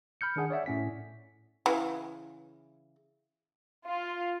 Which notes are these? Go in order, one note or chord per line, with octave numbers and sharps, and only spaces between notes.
B5 F6 G6 C#7
D#3 D4 G#4 F#5
C#5 D5 E5 F#5
A2 C#4 B6
C#3 E3
F4